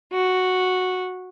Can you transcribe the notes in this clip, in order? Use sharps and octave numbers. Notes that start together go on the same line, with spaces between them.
F#4